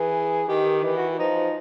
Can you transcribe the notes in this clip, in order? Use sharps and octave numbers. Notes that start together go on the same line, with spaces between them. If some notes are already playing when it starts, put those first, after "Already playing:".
Already playing: E3 G#4
D#3 G4
E3 G4
F#4
F3 D#4